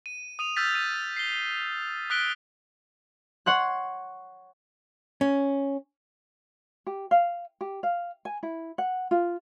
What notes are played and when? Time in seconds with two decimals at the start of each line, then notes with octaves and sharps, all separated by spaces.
0.06 D#7
0.39 D#6 D#7 F7
0.56 E6 F6 G6 A6 B6 F7
0.75 D#7
1.17 C7 G7
2.10 D#6 F#6 B6 D7 G7
3.46 C#5 F#5 C6 F#6
5.21 C#4
6.87 G4
7.11 F5
7.61 G4
7.83 F5
8.25 G#5
8.43 E4
8.78 F#5
9.11 F4